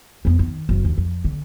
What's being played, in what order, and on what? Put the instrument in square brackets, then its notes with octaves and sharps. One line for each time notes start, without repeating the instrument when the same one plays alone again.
[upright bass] F2 B3
D#3
F#1
D#2
F2
D3